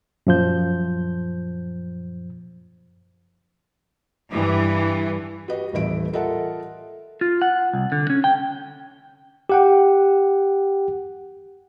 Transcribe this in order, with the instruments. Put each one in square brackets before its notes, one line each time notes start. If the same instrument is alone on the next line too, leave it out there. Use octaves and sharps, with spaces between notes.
[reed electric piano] F#2 A#2 F3 C5 G6
[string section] G2 E3
[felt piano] F#4 G4 B4 D#5
D#1 A1 E3 E5 D7
F4 A4 A#4 D#5 E5 F#5
[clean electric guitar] F4
F#5
C2
D3
C#4
G5
[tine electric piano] G4 F#5 G5